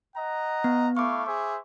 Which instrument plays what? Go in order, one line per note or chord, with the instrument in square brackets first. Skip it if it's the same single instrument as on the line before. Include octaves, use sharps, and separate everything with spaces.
[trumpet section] D#5 F#5 A#5
[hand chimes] B3
[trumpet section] A3 E4 F5 [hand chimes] C#6 D6
[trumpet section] G#4 C5 E5